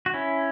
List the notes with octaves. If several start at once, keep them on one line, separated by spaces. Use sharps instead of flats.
F#4
C#4 E4